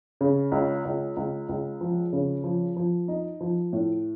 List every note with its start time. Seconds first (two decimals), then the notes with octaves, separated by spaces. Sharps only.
0.21 C#3
0.52 C#2
0.85 C#2
1.16 C#2
1.49 C#2
1.81 F3
2.13 C#3
2.44 F3
2.76 F3
3.08 D#4
3.41 F3
3.73 A2